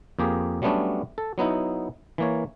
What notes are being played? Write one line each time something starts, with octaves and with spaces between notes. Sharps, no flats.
F2 A#3 G4 G#4
F#3 G3 A3 B3 C#4 D4
A4
F#3 B3 D#4 E4
E3 A#3 C#5